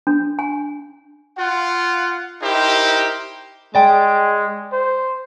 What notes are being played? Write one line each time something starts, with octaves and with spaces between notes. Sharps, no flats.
D4
G#5
F4 F#5
D#4 E4 G4 A#4 C5
G#3 D5 G5
C5